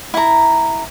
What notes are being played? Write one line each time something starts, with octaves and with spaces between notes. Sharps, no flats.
E4 A#5